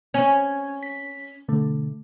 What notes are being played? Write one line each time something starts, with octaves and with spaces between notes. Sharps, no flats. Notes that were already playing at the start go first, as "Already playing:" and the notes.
C#4 G#6
B6
B2 D3 A3